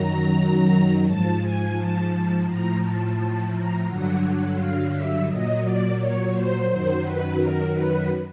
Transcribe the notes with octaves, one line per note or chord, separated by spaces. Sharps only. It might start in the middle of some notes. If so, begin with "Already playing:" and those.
Already playing: F#2 D#3 F#3 A#5
G#2 F3 A5
G#5
A5
A2 F3 A#5
A5
A5
A#5
G2 D3 F#3 F#5
F#5
F5
E5
A#2 F#3 D#5
D5
C#5
C5
F#2 D#3 F#3 C5
B4
A#4
B4